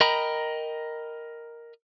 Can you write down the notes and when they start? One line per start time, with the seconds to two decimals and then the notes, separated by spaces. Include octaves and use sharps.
0.01 A#4 D#5 G5 A#5 B5